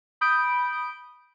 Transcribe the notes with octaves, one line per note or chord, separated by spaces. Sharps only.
B5 D#6 G6 D7